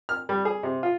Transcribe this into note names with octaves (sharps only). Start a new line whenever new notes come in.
F6
G3
G#4
C3
F4